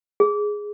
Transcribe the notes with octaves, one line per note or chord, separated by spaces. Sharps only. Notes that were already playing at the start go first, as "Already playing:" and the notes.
G#4